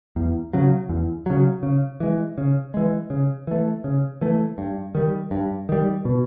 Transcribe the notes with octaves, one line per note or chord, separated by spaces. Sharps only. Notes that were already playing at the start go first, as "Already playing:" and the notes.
E2
C#3 F#3
E2
C#3 F#3
C#3
E3 G#3
C#3
E3 G#3
C#3
E3 A3
C#3
E3 A3
G2
D#3 G3
G2
D#3 G3
B2